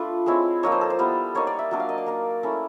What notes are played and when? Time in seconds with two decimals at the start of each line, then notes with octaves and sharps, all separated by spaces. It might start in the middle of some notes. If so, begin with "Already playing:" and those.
Already playing: A3 D4 F4 B4
0.26 G#3 C4 E4 C#5
0.63 F3 A#3 D#4 C#5
0.72 C5
0.81 A4
0.90 C5
0.99 G3 B3 E4
1.35 A#3 D#4 C#5
1.47 D5
1.59 E5
1.71 F#3 A#3 D4
1.80 F5
1.89 D#5
1.98 D5
2.06 A#3 D#4
2.43 A3 C#4 E4